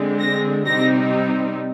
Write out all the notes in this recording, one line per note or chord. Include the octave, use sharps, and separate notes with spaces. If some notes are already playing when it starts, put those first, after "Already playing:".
Already playing: D3 G#3 C4
A#6
C3 G3 C4 D#4 A#6